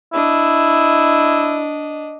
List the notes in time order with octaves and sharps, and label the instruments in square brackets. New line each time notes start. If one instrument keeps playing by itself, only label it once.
[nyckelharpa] D4 D#5 [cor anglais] E4